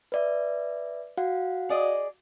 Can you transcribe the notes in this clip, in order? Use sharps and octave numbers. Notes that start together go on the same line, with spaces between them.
B4 D5 E5
F#4 F5 F#5
G#4 D5 D#5